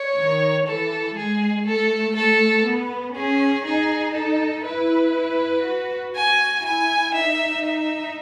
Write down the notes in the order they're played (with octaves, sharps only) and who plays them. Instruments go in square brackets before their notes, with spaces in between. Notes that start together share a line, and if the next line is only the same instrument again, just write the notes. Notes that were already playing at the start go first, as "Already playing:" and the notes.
Already playing: [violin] C#5
[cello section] D#3
[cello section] E3 [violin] A4
[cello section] G#3 [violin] G#4
[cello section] A3 [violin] A4
[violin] A4
[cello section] B3
[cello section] C#4 [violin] G#4
[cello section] D#4 [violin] G#4
[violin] A4
[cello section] E4 [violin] B4
[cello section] E4
F#4
[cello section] F#4 [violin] G#5
[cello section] E4 [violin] G#5
[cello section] D#4 [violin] E5
[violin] E5